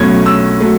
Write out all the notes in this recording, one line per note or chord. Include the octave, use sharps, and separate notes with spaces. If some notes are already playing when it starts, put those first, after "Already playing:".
Already playing: B1 B2 A3 C#4 G#6
E6
F#3 A3